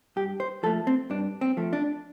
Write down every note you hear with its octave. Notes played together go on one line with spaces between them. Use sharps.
G2 G4
C5
F3 A3 A4
C4
G2 D4
C4
F3 A3
D4